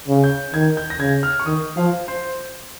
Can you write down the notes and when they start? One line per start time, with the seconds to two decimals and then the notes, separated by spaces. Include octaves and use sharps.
0.08 C#3
0.24 G6
0.54 D#3 G#6
0.77 G6
0.90 A#6
1.00 C#3 G#6
1.23 F6
1.40 C#6
1.46 D#3 D#6
1.77 F3 F5
2.08 C5